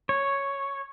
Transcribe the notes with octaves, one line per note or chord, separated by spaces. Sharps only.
C#5